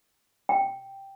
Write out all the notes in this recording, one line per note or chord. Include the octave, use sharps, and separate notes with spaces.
G5